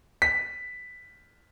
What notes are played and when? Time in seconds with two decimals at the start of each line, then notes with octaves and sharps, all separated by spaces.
0.22 B6